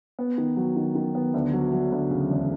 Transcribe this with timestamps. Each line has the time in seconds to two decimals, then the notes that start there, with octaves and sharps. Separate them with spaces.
0.19 B3
0.38 D#3
0.57 F#3
0.76 D#3
0.95 D#3
1.15 B3
1.34 D2
1.53 F#3
1.73 F#3
1.92 D2
2.11 C#3
2.30 E1